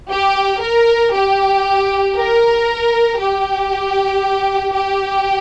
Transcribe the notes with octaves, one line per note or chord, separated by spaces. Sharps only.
G4
A#4
G4
A#4
G4
G4